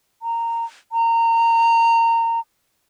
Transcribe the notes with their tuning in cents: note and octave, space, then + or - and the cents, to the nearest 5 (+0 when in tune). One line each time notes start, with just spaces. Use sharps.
A#5 -15
A#5 -25